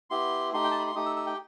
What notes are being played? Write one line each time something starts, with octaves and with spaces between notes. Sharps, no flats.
B3 E4 G4 C6
A3 D#4 G4 C6
G5
A5
B5
C6
A3 D#4 G4 D#6
E6
E6
G5